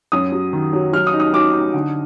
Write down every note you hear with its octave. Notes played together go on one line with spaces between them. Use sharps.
F#2 D#6
F#3
D#3
F#3
F#3 F6
D#6
D#4
D#6
F#3 D6
D#4
D3